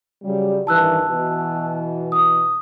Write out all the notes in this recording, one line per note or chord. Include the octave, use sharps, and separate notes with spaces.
C#3 F#3 G3
G2 D#3 E3 A5 E6 F#6
B2 E3
D#6